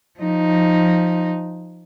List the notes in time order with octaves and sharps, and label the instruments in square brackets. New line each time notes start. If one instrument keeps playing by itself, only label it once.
[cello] F3 D#4